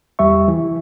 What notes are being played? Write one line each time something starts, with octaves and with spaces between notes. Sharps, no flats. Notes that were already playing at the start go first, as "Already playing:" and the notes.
E2 G3 G4 E5 C#6
E3